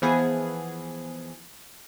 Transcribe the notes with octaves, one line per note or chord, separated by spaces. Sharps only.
E3 F3 B3 G#4